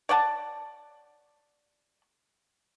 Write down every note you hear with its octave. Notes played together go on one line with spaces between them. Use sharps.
C#5 D5 F#5 A5